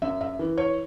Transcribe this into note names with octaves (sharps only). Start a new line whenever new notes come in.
F#2 E5
E5
E3
C#5